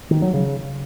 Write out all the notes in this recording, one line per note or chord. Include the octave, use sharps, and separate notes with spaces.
D#3
F#3
C#3